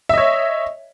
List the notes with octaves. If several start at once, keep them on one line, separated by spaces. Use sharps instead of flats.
C#5 D#5 E5